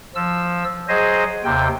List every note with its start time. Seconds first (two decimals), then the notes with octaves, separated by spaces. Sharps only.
0.15 F3 E6
0.88 F#3 G#4 C5 D#5
1.44 D#2 C3 G5